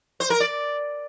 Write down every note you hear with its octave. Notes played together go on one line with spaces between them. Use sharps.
C5
A#4
D5